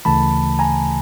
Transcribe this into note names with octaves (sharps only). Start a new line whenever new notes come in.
D2 C#3 E3 A3 A5 B5
G#5 A#5